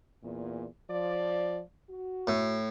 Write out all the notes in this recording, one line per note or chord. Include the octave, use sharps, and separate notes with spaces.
E2 A#2
F3 D5
F#4
A2